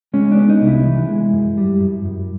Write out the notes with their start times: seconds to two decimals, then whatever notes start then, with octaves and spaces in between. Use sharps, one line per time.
0.14 G#3 C#4
0.32 D4
0.37 B3
0.49 D#4
0.61 C2
0.67 E4
0.86 E3
1.09 G#3
1.33 F#2
1.58 G3
1.81 F#2
2.05 F#2